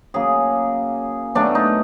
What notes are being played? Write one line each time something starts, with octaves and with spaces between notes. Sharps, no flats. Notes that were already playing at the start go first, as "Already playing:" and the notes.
C#3 F#3 A#3 G#4
B2 F#3 A3 D4
D#4